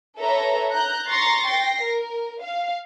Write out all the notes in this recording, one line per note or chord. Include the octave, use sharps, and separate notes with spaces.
A4 B4 C#5 E5 A#5
A#5 F#6 G6
A#5 C6 C#6 A6 A#6 C7
G5 A#6 C7
A#4
F5